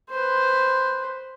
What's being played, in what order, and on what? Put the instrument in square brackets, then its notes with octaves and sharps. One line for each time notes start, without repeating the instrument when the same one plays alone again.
[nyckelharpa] B4 C5